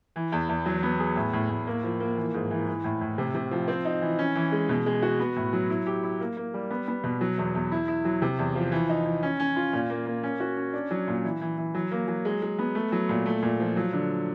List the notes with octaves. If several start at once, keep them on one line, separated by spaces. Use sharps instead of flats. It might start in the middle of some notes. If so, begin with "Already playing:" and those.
E3
E2
E2
F#3
B3
G#4
A2
A2
A2
A#3
F3
A#3
E3
G#2
E3
E3
A2
A2
C3
C3
F3
C4
D#4
E3
C#4
E3
G#3
B2
G#3
F#4
B3
A2
F#3
E4
G4
E4
A#3
A#3
G3
B3
B3
B2
F#3
E2
E2
E4
E4
F#3
C3
E2
F3
E3
D#4
E3
C#4
C#4
F4
A#2
A#3
A#3
C#4
F#4
C#4
D4
F#3
A#2
E3
E3
E3
F#3
A#3
F#3
G#3
G#3
B3
A3
F#3
A#2
A3
A#2
F3
F#3
D3